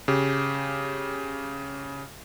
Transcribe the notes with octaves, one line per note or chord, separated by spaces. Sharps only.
C#3 G4